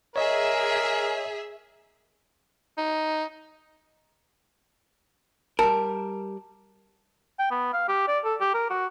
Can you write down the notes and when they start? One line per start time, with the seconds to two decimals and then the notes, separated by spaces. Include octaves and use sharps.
0.16 G#4 A#4 C#5 D#5 E5
2.78 D#4
5.59 G3 A#4 A5
7.39 G5
7.51 B3
7.73 F5
7.88 G4
8.08 D5
8.25 A4
8.41 G4
8.54 A#4
8.70 F#4